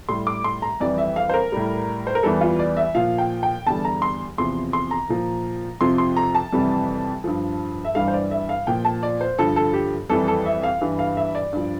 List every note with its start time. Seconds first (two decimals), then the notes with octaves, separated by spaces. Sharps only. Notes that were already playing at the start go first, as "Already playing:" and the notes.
0.09 A2 G3 C6
0.27 D6
0.44 C6
0.62 A#5
0.80 F2 E3 G3 D5
0.98 E5
1.16 F5
1.29 C5
1.34 A#4
1.52 A2 G3
2.07 C5
2.15 A#4
2.23 E2 E3 G3 A4
2.41 F4
2.59 D5
2.77 E5
2.95 A#2 F3 F5
3.18 G5
3.43 G5
3.66 E2 D3 G3 A5
3.85 A#5
4.02 C6
4.38 E2 C3 F3 C6
4.73 C6
4.91 A#5
5.09 A#2 F3
5.81 F2 C3 F3 C6
5.98 C6
6.16 A#5
6.35 A5
6.53 F2 C3 E3 G3
7.24 G2 F3
7.85 E5
7.95 G2 E3 G3 F5
8.08 C5
8.14 D5
8.31 E5
8.49 F5
8.67 A#2 F3 G5
8.85 A5
9.03 D5
9.21 C5
9.38 G2 D3 F3 A4
9.56 A4
9.73 G4
10.09 F2 E3 G3 A4
10.28 A4
10.46 E5
10.63 F5
10.81 G2 E3 G3
10.99 F5
11.17 E5
11.35 D5
11.53 G2 F3